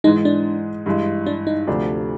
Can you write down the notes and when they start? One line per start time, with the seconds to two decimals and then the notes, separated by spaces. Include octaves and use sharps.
0.04 G#2 E3 G#3 D#4
0.25 D4
0.86 G2 E3 G#3
1.26 D4
1.47 D#4
1.67 D2 C3 F3 A3 D4